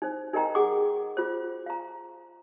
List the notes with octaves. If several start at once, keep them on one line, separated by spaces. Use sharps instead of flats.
D#4 C5
D#4 A#4 D#5 G5 A#5
G#4 F#5 D6
F4 C5
F5 A#5